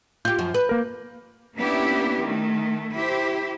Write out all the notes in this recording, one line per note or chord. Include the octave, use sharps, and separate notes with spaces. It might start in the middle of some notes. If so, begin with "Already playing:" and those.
F4 G4 G6
F#2 F3
B4
A#3 A#4
A#3 B3 C#4 D4 E4 G4
D#3 A3
E4 G4 C5